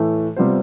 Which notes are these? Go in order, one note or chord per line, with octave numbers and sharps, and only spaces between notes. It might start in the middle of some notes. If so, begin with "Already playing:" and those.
Already playing: A2 E3 A3
C3 G3 B3 F4 C5